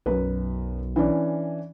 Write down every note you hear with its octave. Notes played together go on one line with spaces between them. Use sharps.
B1 F#2 B4
E3 C#4 D4